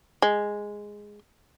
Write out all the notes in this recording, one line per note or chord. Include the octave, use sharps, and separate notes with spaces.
G#3